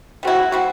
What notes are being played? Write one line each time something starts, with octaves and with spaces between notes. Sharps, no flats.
G3 C4 E4 F#4
G3 C4 E4